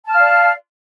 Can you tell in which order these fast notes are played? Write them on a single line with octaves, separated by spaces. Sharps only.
A5 F6 F5 D5